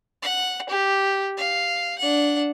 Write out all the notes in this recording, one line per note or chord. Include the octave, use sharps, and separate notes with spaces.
F#5
G4
F5
D4 F#5